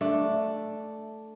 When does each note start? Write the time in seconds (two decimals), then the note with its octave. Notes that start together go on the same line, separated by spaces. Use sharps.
0.01 A3 D4